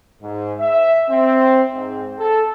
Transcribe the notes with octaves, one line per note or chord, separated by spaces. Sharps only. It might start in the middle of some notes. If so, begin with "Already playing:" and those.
G#2
E5
C4
G#2
A4